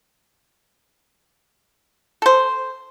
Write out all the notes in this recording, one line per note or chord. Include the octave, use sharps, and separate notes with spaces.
A4 C5